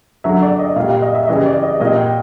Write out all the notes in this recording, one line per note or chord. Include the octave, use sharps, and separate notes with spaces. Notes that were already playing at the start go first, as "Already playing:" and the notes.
D3 F#3 E5
D5
D#5
A#2 G3 F5
F5
D#5
E5
C#3 E3 G3 D#5
D5
D#5
A#2 G3 D#5
G5